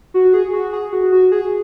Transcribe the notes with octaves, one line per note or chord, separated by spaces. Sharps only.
F#4
G#4
F#4
G#4
F#4
F#4
G#4